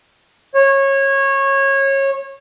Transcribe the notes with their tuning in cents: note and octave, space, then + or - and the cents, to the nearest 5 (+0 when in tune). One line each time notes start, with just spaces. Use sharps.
C#5 -20